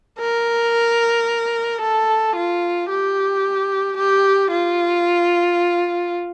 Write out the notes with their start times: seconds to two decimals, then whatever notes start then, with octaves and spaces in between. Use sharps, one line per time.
0.20 A#4
1.81 A4
2.35 F4
2.90 G4
3.97 G4
4.50 F4